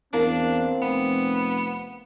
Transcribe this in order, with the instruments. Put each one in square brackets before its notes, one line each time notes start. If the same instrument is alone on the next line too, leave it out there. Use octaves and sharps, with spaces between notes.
[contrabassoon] E2 [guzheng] A#3 [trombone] C4 [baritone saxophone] D4
[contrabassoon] F1 [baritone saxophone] B3